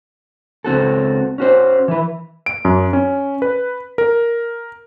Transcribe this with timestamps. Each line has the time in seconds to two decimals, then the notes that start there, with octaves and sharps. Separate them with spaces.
0.64 C#2 C4 F#4 A4
1.38 C#4 F#4 C5
1.88 E3 E4 B4
2.46 D7
2.65 F#2
2.93 C#4
3.42 B4
3.98 A#4